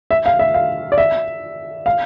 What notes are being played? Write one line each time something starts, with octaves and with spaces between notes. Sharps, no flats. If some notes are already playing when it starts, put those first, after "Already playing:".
E5
F5
E5
F5
D5
E5
F5